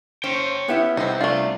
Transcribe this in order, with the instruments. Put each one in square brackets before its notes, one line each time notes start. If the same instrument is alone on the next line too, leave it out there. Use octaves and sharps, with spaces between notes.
[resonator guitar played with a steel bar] C#4 C5 [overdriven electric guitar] C#5 G5
[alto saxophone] B3 [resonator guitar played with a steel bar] C#4 E4 G4
[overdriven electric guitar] C2 [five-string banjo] C4 D#4
[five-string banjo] A3 F4 [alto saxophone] D4